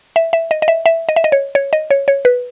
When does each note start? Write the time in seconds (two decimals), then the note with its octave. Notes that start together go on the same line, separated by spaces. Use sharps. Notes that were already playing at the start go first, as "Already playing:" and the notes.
0.16 E5
0.33 E5
0.51 D#5
0.62 D#5
0.68 E5
0.86 E5
1.09 D#5
1.16 E5
1.24 D#5
1.32 C#5
1.55 C#5
1.73 D#5
1.90 C#5
2.08 C#5
2.25 B4